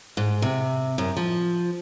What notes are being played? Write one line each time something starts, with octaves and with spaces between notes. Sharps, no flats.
G#2
C3
F#2
F3